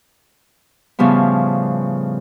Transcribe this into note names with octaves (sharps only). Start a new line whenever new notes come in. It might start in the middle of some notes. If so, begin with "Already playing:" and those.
A2 C#3 F3 G3 B3